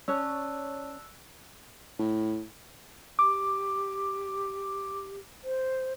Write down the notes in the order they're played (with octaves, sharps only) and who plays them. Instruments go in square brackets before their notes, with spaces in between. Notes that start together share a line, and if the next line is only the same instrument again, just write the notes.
[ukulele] C#4 C#5 [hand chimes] D5 A5 [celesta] E6 F#6
[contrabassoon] A2
[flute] G4 [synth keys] D6
[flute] C5